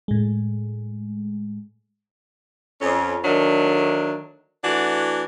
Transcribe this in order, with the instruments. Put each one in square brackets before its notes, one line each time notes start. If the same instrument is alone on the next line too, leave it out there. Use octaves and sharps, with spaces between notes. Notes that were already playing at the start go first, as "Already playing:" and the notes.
[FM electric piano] A2 G#3
[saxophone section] F2 C#4
D3 D#3 F#3 A3 D4
E3 A3 D4 F#4